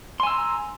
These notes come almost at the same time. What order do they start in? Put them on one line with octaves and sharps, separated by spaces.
C6 G#5 E6 A#5